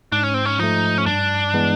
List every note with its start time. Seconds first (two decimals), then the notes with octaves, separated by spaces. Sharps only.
0.12 G#2 D4
0.23 C#4
0.34 C4
0.45 C#4
0.59 F3 A3 D#4
0.98 C#4
1.06 G2 D4
1.54 E3 G#3 B3